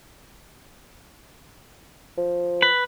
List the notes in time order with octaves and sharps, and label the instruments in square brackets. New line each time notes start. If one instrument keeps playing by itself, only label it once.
[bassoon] F3
[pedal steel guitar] B4